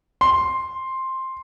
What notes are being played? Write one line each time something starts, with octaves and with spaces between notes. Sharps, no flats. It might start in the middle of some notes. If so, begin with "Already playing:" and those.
C6